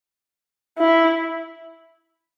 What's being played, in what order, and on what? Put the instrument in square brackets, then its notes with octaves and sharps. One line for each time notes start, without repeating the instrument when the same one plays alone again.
[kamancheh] E4